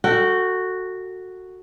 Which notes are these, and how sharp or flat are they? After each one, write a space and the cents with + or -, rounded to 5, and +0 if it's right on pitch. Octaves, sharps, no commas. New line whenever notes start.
F#4 +0 A4 +30 G5 -25